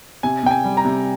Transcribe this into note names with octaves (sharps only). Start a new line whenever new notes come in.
C3 G#5
C3 G5
G#5
G3
A#5
C3